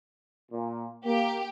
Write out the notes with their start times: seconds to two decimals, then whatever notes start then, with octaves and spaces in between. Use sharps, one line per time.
0.52 A#2
1.05 A#3 G4